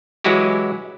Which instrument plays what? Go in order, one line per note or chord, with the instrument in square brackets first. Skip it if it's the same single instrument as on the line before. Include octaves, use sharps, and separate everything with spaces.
[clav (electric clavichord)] E3 F#3 G#3 E4 F#4 G4